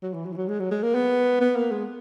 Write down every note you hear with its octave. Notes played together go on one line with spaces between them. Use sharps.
F#3
E3
F#3
E3
F#3
G#3
F#3
G#3
A#3
B3
B3
A#3
G#3